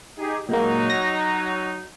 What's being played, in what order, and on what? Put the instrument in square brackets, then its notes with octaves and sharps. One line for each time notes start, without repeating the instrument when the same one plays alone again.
[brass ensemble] D#4 G4 G#4
[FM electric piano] A#2 G#3 A#3 [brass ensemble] F#3 D#4
[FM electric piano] A#6